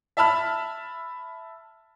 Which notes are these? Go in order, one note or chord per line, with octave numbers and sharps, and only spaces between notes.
E5 A5 B5 F6